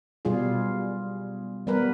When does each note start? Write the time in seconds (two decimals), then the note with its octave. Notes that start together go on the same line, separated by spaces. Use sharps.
0.25 B2 G3 F4 G#4
1.67 G3 B3 A#4 B4